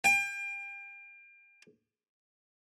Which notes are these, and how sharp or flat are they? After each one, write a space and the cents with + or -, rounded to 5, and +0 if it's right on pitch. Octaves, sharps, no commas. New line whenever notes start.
G5 +35